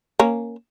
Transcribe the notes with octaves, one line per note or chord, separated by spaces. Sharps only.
A#3 C#4